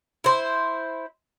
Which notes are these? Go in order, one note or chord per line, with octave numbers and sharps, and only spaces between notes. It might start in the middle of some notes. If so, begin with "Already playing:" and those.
E4 C5